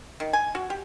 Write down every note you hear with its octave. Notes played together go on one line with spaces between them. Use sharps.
D#3
G#5
F#4
G4